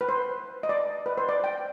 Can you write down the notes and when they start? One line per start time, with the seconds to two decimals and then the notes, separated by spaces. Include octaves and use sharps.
0.01 B4
0.09 C5
0.63 D#5
0.69 D5
1.06 B4
1.18 C5
1.29 D5
1.44 G5